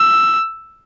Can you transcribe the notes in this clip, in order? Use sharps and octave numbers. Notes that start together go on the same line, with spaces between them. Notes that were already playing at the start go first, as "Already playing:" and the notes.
Already playing: E6